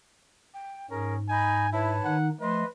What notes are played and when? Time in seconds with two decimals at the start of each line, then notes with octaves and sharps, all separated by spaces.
0.54 G5
0.90 G#2 C#4 G#4 A#4
1.29 D#4 G#5 B5 G6
1.73 E4 B4 C#5 A5
2.05 D#3 D#4 F#5
2.40 F3 A3 B4 D#5 C6